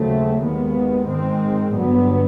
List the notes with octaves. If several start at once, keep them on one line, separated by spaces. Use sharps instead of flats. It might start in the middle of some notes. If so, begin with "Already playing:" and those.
Already playing: D#2 C#3 F#3 A3 C4
D#2 D#3 G#3 B3
G#2 D#3 G#3 C4
G2 D3 F#3 B3